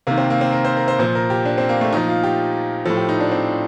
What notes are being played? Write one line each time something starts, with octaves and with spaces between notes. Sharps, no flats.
C3 D#3 A#3
C4
A#3
C4
A#4
C5
A#4
C5
A#2 F3 C5
A#4
G4
D4
C4
A#3
A3
A#2 F3 D#4
F4
G4
A2 F3 A4
G4
D#4
D4
C4